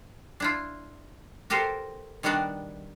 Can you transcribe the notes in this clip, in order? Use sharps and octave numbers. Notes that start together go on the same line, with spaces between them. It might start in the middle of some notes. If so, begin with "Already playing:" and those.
D4 E4 F4
F#4 G4 A4 A#4 C5
D#3 G3 B3 D4 F#4 D5